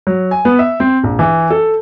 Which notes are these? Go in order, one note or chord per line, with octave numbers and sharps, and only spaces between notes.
F#3
G#5
B3
E5
C4
A#1
E3
A4